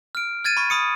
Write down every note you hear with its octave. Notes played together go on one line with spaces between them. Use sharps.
F6 D7
F6 G#6 A6 D#7
B5 C#6
B5 D#6 C#7